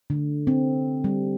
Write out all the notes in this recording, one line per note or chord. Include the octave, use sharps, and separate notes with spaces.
D3
C4
G3